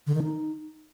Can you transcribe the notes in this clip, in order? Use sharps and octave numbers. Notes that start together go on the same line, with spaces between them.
D3
D#3
D#4